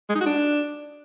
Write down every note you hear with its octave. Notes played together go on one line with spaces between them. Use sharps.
G#3
D#4
F#4
D4